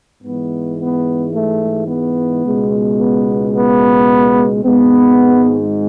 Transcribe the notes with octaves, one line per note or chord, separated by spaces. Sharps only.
G#2 E3 G#3 B3
B3
A3
B3
C#2 B2 G#3
B3
B3
G#1 G#2 G#3 B3